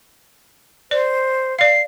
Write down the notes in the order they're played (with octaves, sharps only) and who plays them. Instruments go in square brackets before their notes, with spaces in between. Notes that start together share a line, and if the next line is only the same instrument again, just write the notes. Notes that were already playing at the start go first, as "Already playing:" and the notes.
[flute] C5 [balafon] D5
[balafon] D5 F5 [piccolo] C7